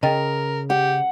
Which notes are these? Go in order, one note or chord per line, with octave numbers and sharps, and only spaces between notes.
C#3 A#4 D#5 G5 A6
G4 F#5